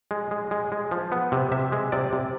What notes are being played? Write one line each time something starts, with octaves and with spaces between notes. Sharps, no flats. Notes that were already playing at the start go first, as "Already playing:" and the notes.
G#3
G#3
G#3
G#3
F3
B3
C3
C3 E5
G#3
C3 D5
C3